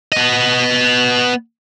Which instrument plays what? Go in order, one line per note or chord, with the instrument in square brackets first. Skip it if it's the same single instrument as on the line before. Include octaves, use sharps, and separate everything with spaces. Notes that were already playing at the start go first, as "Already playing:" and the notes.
[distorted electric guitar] B3 D#5